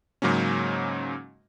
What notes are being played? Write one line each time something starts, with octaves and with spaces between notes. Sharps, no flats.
G#2 C#3 F#3 A#3 C#4